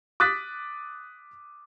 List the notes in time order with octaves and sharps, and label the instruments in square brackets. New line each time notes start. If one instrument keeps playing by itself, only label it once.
[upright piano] D6 D#6 F#6 A6 B6